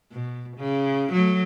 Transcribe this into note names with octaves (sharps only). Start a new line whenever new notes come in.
B2
C#3
F#3 A3